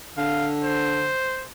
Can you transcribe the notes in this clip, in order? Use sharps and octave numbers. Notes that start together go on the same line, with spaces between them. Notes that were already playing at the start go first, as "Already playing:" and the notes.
D3 F5
C5